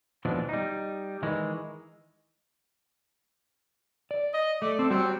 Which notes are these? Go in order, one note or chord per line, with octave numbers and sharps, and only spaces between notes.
D#2 B2 E3 F3 G#3 D4
G3 D#4
D#3 E3 G#3
D5
D#5
A3 D5
C4 A4
G3 C4 F#4